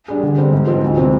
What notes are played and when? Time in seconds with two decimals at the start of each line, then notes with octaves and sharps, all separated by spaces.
0.08 G3 D4 G#4
0.23 D3
0.38 G3 C4
0.52 G#2
0.67 F3 G#3 C4
0.83 D2
0.97 C3 F3 G#3 C4